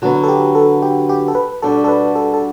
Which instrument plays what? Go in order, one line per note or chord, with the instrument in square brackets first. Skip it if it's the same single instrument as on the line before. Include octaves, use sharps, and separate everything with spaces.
[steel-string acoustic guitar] D3 F#3 B3 [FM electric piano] F#4
[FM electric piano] A4
G4
A4
G4
G4
A4
B4
[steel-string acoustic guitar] B2 G3 D4 F#4 [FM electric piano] A4
[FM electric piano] A4
B4
A4
A4